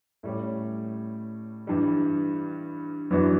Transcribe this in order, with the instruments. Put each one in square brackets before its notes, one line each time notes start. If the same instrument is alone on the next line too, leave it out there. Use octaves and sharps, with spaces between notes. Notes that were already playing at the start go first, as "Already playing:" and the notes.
[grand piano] A2 G3 C#4
G2 E3 G3
F#2 E3 B3 D4 F#4